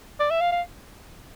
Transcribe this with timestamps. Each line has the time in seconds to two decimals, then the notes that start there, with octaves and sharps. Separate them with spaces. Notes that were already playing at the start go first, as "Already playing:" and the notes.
0.20 D5
0.31 E5
0.41 F5
0.52 F5